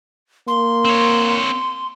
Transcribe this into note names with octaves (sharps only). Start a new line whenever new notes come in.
A#3 C6
C4 C#5